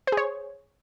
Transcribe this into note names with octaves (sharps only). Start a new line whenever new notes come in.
G#4 C5 C#5